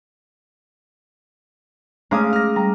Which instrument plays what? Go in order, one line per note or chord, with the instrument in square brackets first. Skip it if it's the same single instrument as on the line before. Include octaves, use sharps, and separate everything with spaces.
[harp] G#3 C#4 F5 [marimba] A3 [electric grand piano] A#5 D6 D#6
[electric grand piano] F6 A#6
[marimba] G3 [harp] A#5